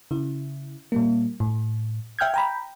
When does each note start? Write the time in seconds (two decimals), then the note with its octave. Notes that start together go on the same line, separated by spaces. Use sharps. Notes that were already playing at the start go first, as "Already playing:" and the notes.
0.11 C#3 E4
0.92 A#2 G3 A#3
1.40 A2
2.19 E5 G5 F6 G6 G#6
2.34 G5 A#5 B5